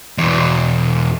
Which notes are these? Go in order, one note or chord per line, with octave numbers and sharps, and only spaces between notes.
E2 B2